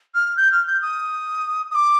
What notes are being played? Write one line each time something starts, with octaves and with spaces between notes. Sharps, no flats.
F6
G6
F6
G6
D#6
D#6
D6